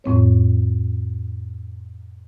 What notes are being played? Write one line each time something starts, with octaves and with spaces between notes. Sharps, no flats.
F2 A2 C4 C#5